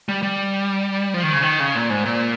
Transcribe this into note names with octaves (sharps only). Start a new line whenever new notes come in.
G3
G3
F3
D#3
C#3
D#3
C#3
A#2
G#2
A#2